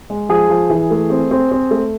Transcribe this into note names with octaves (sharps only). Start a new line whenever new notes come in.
G#3
F3 G#4
F3
E3
A3
C4
C4
C4
A3